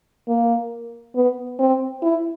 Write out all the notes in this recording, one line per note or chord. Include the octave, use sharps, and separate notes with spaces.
A#3
B3
C4
E4